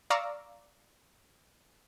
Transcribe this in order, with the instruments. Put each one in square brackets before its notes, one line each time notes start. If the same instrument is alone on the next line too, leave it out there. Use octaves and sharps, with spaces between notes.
[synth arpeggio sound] D5 F5 A#5 C#6 D6 E6